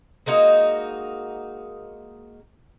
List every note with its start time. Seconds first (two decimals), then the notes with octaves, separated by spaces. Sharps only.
0.26 G#3 A#3 D#4 F#4